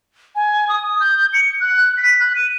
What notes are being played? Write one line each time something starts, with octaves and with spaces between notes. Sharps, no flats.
G#5
D#6
G6
C#7
F#6
B6
F#6
D#7